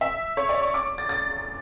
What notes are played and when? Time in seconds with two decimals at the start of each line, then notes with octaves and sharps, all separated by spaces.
0.01 E5
0.37 C#5
0.49 D5
0.62 C#6
0.74 D6
0.98 A6
1.09 A6